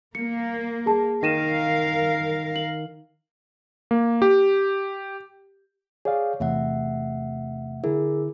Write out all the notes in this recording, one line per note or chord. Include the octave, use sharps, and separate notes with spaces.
A#3 C#7
G#4 A5
D#3 A#4 F5 A#6 D#7 E7
F#7
A#3
G4
G#4 C#5 D5 F5
E2 C3 A3 E5 F#5
D3 E4 G#4 A#4